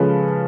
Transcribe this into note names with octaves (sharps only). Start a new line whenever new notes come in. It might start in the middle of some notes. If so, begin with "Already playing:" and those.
Already playing: C#3 F3 G#3 C#4 A4 B4